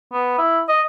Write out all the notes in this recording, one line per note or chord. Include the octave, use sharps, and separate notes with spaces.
B3
E4
D#5